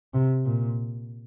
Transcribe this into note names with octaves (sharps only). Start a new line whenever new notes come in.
C3
A#2